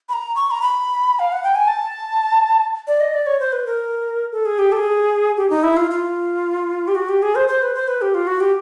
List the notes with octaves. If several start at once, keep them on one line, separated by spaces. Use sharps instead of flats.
B5
A#5
C#6
A#5
B5
F5
F#5
G5
G#5
A5
D5
D#5
D5
C#5
C5
B4
A#4
A4
G#4
G4
A4
G#4
G4
D#4
E4
F4
F4
G4
F#4
G4
G#4
C5
C5
B4
C5
B4
G4
F4
F#4
G4